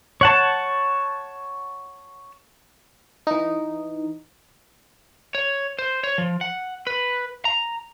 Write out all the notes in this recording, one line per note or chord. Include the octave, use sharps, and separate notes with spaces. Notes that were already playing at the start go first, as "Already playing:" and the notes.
C#5 F#5 A5
E3 D#4
C#5
C5
C#5
F3
F#5
B4
A#5